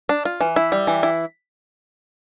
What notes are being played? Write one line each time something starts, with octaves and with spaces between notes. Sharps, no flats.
D4
F4
E3
E4
G3
E3
E4